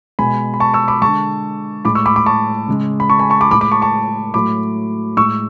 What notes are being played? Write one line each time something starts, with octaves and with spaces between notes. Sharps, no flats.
B2 G#3 G#5 B5
B5
A5 C#6
C#6 E6
B5 D6
D3 G#3 A5 C#6
A2 G#3 B5 D6
C#6 E6
B5 D6
B5 D6
A5 C#6
C#3 G#3
B5
A5 C#6
G#5 B5
A5 C#6
B5 D6
A2 G#3 B5 D6
B5 D6
A5 C#6
A5 C#6
A2 F#3 A3 B5 D6
A2 G#3 C#6 E6